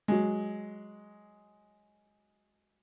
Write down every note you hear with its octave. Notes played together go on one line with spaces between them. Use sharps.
F#3 G#3